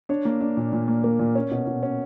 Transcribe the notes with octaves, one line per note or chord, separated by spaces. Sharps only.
D4 C#5
A#3
D4
A#2
A#2
A#3
A#3 A#4
A#2
C#4
B2
B2
C#4